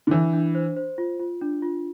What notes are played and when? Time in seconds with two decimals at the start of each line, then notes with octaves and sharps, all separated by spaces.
0.07 D3
0.11 E3 D4
0.33 D4
0.55 C5
0.77 C5
0.98 F4
1.20 F4
1.41 D4
1.62 F4